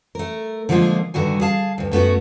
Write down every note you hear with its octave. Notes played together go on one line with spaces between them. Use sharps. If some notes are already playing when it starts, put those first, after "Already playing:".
A3 A#4
D3 F3 G#3 A#3 F4 G#4
G2 D3 D#3 F#4 G#5
G#4 F5 A5
D2 G2
F#2 A3 B3 F#4